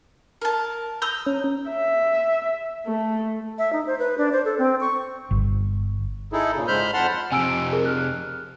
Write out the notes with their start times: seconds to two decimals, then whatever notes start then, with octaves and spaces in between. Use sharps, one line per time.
0.42 A#4 A5
1.02 A#5 D#6 E6 G6
1.26 C#4
1.70 E5
2.87 A3
3.58 E5
3.73 D#4
3.87 C5
3.99 B4
4.18 D4
4.32 C5
4.45 A4
4.58 C4
4.81 C#6
5.31 G1
6.33 D#4 E4 G#4 A4
6.54 A#2 C#3
6.68 G#2 G#3 C5 B5 F6 G6
6.93 F2 F#5 A5 B5 C6 F6
7.32 F2 C3 G#5 E6 D7
7.73 G#4 A#4
7.85 F6 F#6